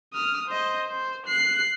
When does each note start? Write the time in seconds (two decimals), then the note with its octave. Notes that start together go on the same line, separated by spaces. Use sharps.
0.14 D#6 F6
0.48 C5 D#5
0.87 C5
1.27 F#6 C7